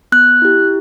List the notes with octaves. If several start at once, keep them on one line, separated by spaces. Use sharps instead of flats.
B3 F#6
E4 G4